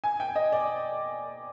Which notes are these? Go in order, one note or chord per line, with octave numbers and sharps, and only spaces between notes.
G#5
G5
D#5
D5